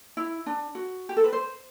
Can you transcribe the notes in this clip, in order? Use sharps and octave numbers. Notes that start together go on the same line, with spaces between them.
E4
D4
F#4
G4
A4
B4
C5